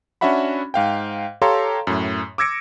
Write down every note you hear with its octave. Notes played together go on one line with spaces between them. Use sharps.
C#4 D4 F#4 E5 F#5 B5
G#2 F5 G5
G4 A4 C#5 F5 A#5 C6
F#2 A2
D6 E6 G#6 A#6 C#7 D7